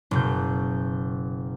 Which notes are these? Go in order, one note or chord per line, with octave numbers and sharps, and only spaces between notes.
F#1 B2 G6